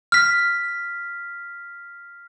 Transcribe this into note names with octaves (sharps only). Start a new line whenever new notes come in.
F6 B6